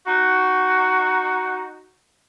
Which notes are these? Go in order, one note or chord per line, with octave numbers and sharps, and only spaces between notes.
D#4 F#4